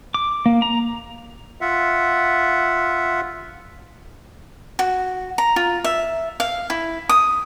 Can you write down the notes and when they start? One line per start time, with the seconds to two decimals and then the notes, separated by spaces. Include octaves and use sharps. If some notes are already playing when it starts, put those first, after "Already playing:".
0.14 D6
0.46 A#3
0.62 A#5
1.61 F4 E5 F#5
4.79 F#4
5.38 A#5
5.56 F4
5.84 E5
6.40 F5
6.70 E4
7.09 D#6